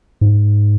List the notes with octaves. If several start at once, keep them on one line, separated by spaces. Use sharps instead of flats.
G#2